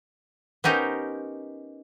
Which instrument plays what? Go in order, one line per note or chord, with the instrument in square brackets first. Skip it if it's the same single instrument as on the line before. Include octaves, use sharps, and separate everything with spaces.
[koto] B3 C#4 D#4 G4 A#4 C5